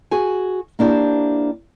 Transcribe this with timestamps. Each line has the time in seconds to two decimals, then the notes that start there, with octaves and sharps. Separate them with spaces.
0.11 F#4 G#4 G#5
0.79 A#3 D4 E4 G4 C5